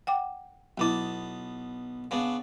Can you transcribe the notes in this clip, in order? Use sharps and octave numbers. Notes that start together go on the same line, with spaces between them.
F#5 G5 D6
B1 F#3 B3 E4 A5
C#3 B3 D4